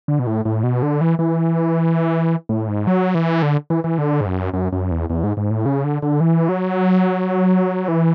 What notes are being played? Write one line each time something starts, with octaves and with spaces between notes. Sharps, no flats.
D3
B2
A2
A2
B2
D3
E3
E3
A2
G#2
F#3
E3
D3
E3
E3
D3
G#2
F#2
F#2
F#2
E2
E2
G#2
G#2
A2
C#3
D3
D3
E3
F#3
E3